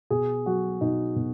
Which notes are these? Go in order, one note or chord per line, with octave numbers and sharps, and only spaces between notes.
B2 G#4
F#3 F#4
B2 D#4
B2